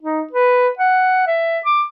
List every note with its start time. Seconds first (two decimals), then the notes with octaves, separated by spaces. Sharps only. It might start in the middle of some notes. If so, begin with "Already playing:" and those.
0.02 D#4
0.33 B4
0.79 F#5
1.27 E5
1.66 D6